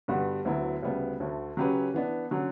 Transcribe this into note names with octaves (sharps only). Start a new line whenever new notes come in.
G2 D3 G3 B3 F#4
D2 D3 F#3 B3 E4
D2 C#3 G3 B3
D2 D3 A3
C#3 F#3 C#4 G4 B4
E3 B3 D4
D3 F#3 C#4